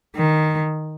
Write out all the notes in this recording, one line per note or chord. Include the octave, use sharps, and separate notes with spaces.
D#3